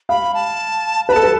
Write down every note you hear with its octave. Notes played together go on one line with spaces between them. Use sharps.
F5 B5
A5
B4 B5
A4 A5
B4